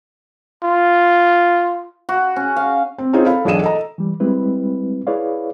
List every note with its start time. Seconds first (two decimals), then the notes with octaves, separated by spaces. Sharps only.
0.63 F4
2.09 F#4
2.36 C#4
2.56 F5
2.98 C4
3.13 C4 C#4 D#4 F4 G#4 C5
3.26 A4 F5 B5
3.45 E1 B1 D4 G#4 D#7 E7
3.62 A4 D#5 A#5
3.98 E3 G3
4.20 G3 G#3 C4 E4 B4
5.07 E4 G#4 B4 C#5 D5 F5